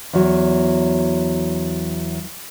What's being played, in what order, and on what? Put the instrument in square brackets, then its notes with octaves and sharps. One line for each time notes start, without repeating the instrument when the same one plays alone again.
[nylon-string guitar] E2 F#3